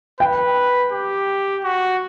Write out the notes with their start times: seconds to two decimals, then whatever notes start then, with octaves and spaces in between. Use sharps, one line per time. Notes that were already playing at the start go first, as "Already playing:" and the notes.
0.20 B4 G5
0.92 G4
1.64 F#4